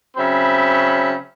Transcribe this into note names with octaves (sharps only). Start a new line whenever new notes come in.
C#3 F#3 C4 E5 B5